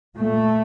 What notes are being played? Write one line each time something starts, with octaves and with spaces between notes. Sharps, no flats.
A#2 A3